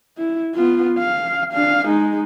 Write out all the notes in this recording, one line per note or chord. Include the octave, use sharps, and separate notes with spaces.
E4
B3 F4
F5
D4 F5
G#3 D#4